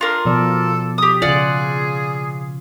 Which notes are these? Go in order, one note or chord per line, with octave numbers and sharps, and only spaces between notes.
D4 F4 A#4 C6
B2 F3 A4 D5
G4 D#6
C#3 F4 G#4 D5 F5 F#5